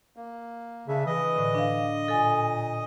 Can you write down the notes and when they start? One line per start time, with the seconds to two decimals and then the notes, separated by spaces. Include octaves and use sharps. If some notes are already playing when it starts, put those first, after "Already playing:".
0.16 A#3
0.88 C#3 D4 E5
1.06 E3 D#5 D#6
1.36 A2 D3
1.55 D4 F5
2.08 A#2 A4 G#5